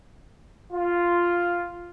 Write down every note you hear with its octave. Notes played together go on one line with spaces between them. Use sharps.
F4